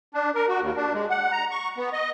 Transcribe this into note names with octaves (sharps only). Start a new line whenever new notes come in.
D4
A#4
F#4
D#2
D4
G#3
F#5
A#5
C#6
B3
D#5